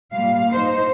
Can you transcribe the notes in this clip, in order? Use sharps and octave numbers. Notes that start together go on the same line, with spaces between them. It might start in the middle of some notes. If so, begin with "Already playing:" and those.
A#2 G3 F5
D#4 C5